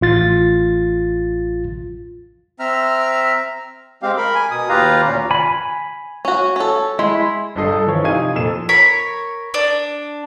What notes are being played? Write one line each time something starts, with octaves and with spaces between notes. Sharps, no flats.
A1 F4 A6
C4 E5 A#5 F6
G#3 C4 G4 F5
A#4 B5
G#5
B2 D#6
D#2 F4 G4 B4 F5 A#5
D2 A#2 C#4
G#5 B5
C#4 F#4
C#4 A4
G#3 E4 C6
G1 G2 A4 D#5 C7
A4
E3 F3 C#5
C3 D#4 F4 G#5 G#6 D#7
F2 A#2 A4 E7
A#4 C#5 B5
D4